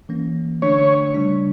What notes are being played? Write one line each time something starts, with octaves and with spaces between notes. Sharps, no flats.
E3 A#3 C#4
D3 A3 D4 C#5
C#3 G3 D4